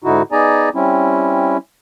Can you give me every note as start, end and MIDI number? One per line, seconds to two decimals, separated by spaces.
0.04 0.22 44
0.04 0.22 50
0.04 0.22 63
0.04 0.22 64
0.04 0.22 66
0.32 0.69 59
0.32 0.69 63
0.32 0.69 68
0.32 0.69 74
0.32 0.69 80
0.32 0.69 82
0.75 1.57 55
0.75 1.57 60
0.75 1.57 61
0.75 1.57 64